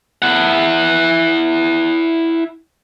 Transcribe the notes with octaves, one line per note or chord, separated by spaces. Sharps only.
E4 F#5